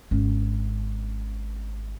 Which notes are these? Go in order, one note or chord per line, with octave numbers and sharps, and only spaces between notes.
G#1 C#4